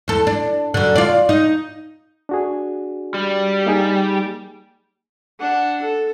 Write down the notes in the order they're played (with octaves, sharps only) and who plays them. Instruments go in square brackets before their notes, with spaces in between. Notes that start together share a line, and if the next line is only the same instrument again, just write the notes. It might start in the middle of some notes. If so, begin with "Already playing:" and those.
[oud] E2 A4
D4
F#2 D3
F4 D5
D#4
[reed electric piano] D4 F#4 G#4
[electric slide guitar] G3
[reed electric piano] A#3 D#4 G#4
[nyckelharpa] D4 F#5
A4